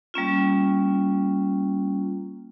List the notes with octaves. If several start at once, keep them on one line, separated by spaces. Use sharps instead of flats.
G3 A#3 C#4 F4